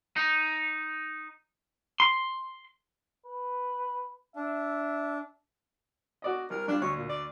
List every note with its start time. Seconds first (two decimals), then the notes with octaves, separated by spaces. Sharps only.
0.16 D#4
2.00 C6
3.26 B4
4.36 D4 E5
6.22 F#4 D5 D#5
6.50 C2 A#4
6.68 G2 D4 F4
6.82 D2 C#5
6.96 A#2
7.09 D5